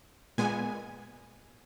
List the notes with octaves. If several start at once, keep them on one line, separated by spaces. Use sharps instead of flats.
A#2 G#3 B3 G#5